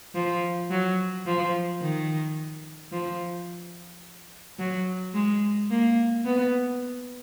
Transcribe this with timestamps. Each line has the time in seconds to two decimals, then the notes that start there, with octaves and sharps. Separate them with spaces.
0.15 F3
0.70 F#3
1.26 F3
1.81 D#3
2.92 F3
4.59 F#3
5.14 G#3
5.70 A#3
6.25 B3